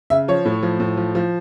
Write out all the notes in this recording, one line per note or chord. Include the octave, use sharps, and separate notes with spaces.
C#3 E5
F3 C#5
A2
F3
A2
F3
F3